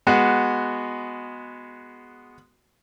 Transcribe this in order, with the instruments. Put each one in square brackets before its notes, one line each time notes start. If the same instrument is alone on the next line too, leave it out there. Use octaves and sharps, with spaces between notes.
[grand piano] G#3 B3 F#4